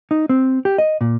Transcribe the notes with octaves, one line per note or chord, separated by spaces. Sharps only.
D#4
C4
G4
D#5
A#2